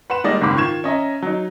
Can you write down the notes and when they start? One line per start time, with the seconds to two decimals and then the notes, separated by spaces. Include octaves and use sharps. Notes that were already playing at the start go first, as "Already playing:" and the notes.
0.10 B4 F#5 C6 E7
0.24 D#3 G3 G#3 A#3 D5 D#5
0.41 F#1 C#2 G#2 D#3 B5 D6
0.56 D#3 F4 C#6 G#6 E7
0.84 C#4 D#5 E5 A#5
1.22 F#3 D#4